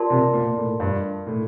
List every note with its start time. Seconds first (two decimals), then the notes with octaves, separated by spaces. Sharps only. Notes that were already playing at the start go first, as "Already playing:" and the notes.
Already playing: F4 A#4 D5 A5 C6
0.10 C3
0.34 A#2
0.57 A2
0.80 G2
1.27 A2